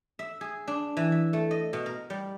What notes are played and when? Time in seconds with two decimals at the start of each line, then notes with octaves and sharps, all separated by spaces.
0.19 E5
0.41 G#4
0.67 D4
0.97 E3
1.12 E5
1.33 A3
1.51 D#5
1.73 B2
1.86 A#4
2.10 G3